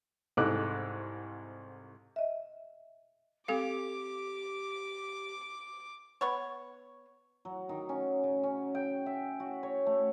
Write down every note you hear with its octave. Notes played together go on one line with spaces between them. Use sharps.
C2 G#2 A4 D6 F#6
D#5 E5
C4 G4 A4 F5 D6
B3 C#5
F#3
D#3
C#4
C#3
C#4
G5
E5
F#4
C#5
A3